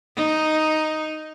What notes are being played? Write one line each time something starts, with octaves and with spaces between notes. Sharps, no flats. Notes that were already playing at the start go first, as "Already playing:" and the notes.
D#4